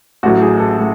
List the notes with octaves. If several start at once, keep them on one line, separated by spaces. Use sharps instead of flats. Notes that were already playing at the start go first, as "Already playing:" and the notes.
A1 A2 F#3 F#4
G#4
A4
A2